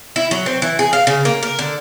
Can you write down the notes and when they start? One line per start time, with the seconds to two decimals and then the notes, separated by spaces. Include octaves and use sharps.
0.16 E4
0.31 F#3
0.46 C4
0.62 E3
0.79 G#4
0.93 F5
1.07 C#3
1.25 A#3
1.43 A#4
1.59 D3